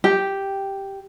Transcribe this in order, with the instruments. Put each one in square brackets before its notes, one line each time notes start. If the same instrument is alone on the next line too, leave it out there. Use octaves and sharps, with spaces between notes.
[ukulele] G4